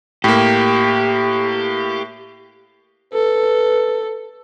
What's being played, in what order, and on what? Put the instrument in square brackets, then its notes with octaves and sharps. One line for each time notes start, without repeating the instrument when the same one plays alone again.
[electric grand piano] A2 A#3 [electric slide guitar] G4
[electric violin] A4 [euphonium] B4